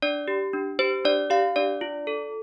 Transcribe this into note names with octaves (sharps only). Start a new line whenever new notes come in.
D4 D5
G4
D4
G4 C5
D4 D5
G4 F5
D4 D5
F4
A4